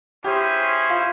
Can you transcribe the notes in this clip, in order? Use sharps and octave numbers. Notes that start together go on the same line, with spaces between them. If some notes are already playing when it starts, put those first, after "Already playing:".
C#4 E4 G4 G#4 C5
F4